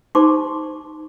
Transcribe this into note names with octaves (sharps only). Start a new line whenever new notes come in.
D#4 G4 C5 A5 C6 D6